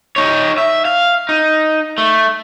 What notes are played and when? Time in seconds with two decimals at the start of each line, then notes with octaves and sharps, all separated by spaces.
0.16 D#4 C#5
0.58 E5
0.85 F5
1.29 D#4
1.98 A3